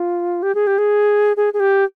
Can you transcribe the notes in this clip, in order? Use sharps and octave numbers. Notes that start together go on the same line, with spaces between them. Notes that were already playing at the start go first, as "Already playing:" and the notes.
Already playing: F4
G4
G#4
G4
G#4
G#4
G#4
G4